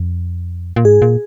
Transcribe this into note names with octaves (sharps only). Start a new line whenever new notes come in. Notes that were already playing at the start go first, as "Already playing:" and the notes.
Already playing: F2
A#2
G#2 G#4
A#2